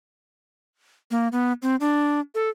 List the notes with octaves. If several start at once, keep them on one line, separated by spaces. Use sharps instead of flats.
A#3
B3
C4
D4
A4